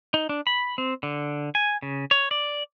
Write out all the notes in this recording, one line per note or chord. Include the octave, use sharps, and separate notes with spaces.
D#4
D4
B5
C4
D3
G#5
C#3
C#5
D5